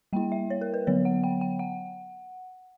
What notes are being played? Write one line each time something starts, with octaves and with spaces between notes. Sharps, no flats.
G3 A#3 E4 G5
E5
C#5
A#4
B4
D3 F#3 B3 C#5
F#5
G5
G5
F#5